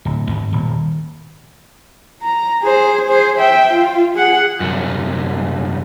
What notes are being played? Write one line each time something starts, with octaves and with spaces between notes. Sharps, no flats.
D1
G#1
D#1
A#5
G#4 C5
G#4 C5
E5 G5
F4
G#4 F#5
C2 F#2